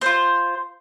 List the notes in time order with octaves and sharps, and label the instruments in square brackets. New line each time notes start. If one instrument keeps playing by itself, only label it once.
[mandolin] F4 C5